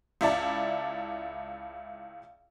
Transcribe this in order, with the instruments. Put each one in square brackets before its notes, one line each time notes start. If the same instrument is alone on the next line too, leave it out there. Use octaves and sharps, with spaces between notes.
[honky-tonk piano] C#2 E4 D5 A5